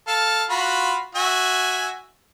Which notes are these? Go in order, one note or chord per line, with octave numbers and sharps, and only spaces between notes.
A4 F5 A5
F4 F#4 B5
F#4 E5 G#5